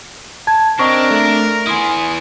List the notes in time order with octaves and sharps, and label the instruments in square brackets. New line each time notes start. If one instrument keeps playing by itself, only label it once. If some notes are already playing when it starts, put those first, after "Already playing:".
[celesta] A5 G#6
[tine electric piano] C4 D#5 [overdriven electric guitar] D4 [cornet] A#4 [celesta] C#6
[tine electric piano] A3
[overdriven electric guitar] B3 E4 [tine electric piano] G#5 C6 D#6